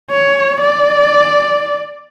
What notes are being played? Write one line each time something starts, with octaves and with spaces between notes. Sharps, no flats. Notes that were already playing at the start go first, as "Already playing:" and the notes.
C#5
D5